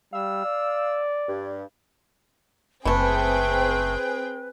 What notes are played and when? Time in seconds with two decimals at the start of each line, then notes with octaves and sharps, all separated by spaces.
0.14 G3 F5 E6
0.45 D5
1.29 G2
2.85 F#1 E3 A3 C4 G#4 B4 G5